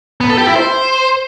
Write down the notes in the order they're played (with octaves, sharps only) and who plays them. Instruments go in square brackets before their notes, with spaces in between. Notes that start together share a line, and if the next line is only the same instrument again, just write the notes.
[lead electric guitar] B3
A4
G4
E4
C5